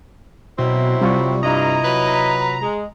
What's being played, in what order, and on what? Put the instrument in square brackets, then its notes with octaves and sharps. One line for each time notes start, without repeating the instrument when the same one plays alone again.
[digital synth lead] B2 [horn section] F#3 C4 E4
[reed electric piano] C3 F4 C#6 [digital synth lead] G3
[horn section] G2 [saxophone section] E4 D#5 [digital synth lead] A#5
[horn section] F#3 B4
[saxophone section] G#3